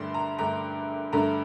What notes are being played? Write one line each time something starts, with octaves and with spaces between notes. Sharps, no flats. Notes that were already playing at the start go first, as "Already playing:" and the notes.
Already playing: G2 D3 A3 C6
A#5
G2 D3 A3 A#5
G2 D3 A3 A#5